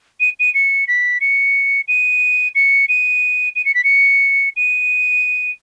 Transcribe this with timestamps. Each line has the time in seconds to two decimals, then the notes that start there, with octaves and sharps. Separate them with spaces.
0.20 D#7
0.40 D#7
0.54 C#7
0.88 B6
1.21 C#7
1.88 D#7
2.55 C#7
2.89 D#7
3.56 D#7
3.65 C#7
3.75 B6
3.84 C#7
4.57 D#7